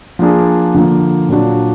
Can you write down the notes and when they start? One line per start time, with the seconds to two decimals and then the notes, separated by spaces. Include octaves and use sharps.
0.19 F3 A#3 D4 G#4
0.74 D3 F3 A#3
1.29 A#2 F#3 D4 F#4